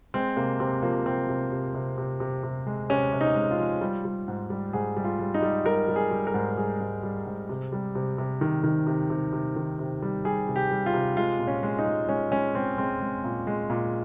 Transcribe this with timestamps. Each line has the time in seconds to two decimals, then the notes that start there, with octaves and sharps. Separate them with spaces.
0.14 G#3 C4
0.37 C3 A#3
0.60 C3 C4
0.83 F3 A#3
1.06 C3 C4
1.29 C3
1.52 C3
1.75 C3
1.98 C3
2.20 C3
2.43 C3
2.67 G#3
2.90 C3 C#4
3.12 C3
3.21 D#4
3.35 G#3
3.51 F4
3.59 F3
3.81 G3
4.05 G3
4.28 G#2
4.50 G3
4.73 G#2 G#4
4.97 G3
5.04 F4
5.19 G3
5.34 D#4
5.42 G3
5.65 G3 A#4
5.88 G3
5.96 G#4
6.11 G3
6.27 A#4
6.34 G#2
6.57 G3 G#4
6.81 G#2
7.03 G3
7.26 G#2
7.49 C3
7.72 G3
7.95 C3
8.18 C3
8.41 D#3
8.64 D#3
8.87 C3
9.10 C3
9.33 C3
9.56 D#3
9.79 C3
10.02 G3
10.25 G3 G#4
10.48 C3
10.56 G4
10.71 G3
10.86 F4
10.94 C3
11.17 G#3 F4
11.39 A#2
11.47 C#4
11.63 G#3
11.79 D#4
11.86 G#3
12.09 G#3 C#4
12.32 G#3 C#4
12.55 G#3 C4
12.78 G#3 C4
13.01 G#3
13.24 A#2
13.47 G#3
13.69 A#2